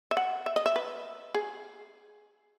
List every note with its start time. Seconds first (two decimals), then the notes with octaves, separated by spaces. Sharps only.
0.11 E5
0.17 F#5
0.46 E5
0.56 D#5
0.66 E5
0.76 B4
1.34 G#4